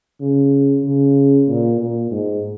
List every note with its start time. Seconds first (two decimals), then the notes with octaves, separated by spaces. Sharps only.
0.20 C#3
0.84 C#3
1.48 A#2
1.80 A#2
2.11 G#2